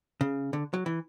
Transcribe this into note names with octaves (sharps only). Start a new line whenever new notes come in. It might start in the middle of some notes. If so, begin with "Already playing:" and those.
C#3
D3
F#3
E3